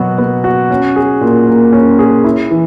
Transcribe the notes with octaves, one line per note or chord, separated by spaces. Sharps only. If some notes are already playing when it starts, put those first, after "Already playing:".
Already playing: B2 F#3 B3 F#4
B3
F#4
C#4
G#4
A#2
A#3
C#4
G#4
E4
E3